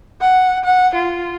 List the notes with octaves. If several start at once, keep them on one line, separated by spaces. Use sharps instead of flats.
F#5
F#5
F4